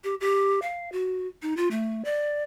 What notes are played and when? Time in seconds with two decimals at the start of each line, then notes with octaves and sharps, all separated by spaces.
0.04 G4
0.21 G4
0.62 F5
0.92 F#4
1.42 D#4
1.57 F4
1.71 A3
2.05 D5